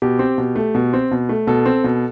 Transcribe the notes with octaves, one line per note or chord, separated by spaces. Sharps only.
B2 G4
C4
B2
A3
B2
C4
B2
A3
B2 A4
C4
B2